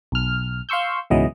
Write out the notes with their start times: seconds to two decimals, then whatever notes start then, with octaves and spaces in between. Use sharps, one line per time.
0.12 B1 F6
0.69 F5 C6 C#6 E6 G6
1.10 C#2 G#2 B2 E3 F#3 D#5